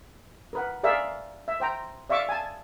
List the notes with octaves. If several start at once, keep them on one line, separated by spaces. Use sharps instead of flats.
A#4 B4 F#5
G#4 A#4 D5 E5 F5
E5
C5 G5 A#5
D5 E5 F5 C#6 D6
G#5 A5